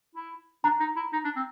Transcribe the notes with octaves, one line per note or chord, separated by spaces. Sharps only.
E4
D4 A#5
D#4
E4
D#4
D4
C4